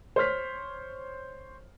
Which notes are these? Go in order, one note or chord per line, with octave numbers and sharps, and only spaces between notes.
C5 C#5 F6 B6